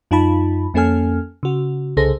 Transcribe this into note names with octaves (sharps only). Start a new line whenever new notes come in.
F#2 D#4 F4 A5 B5
F2 A#3 C#4 A4 G#5 F6
C#3 F#4
C2 C#3 G#4 A4 C5 A#6